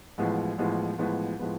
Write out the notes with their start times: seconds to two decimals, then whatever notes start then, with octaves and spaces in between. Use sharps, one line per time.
0.18 A1 A2 F3 G#3 B3
0.58 A1 A2 F3 G#3 B3
0.99 A1 A2 F3 G#3 B3
1.39 A2 F3 G#3 B3